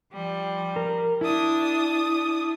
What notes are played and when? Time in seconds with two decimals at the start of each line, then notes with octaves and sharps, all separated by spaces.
0.11 F3 G3
0.76 A#4
1.21 D4 E4 D#6